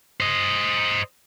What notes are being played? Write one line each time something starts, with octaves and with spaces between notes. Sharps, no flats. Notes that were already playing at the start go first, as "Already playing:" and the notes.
C5 D#5